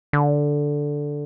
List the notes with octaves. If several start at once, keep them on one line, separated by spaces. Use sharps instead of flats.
D3